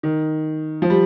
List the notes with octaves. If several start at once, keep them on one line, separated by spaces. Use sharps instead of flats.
D#3
F3
G3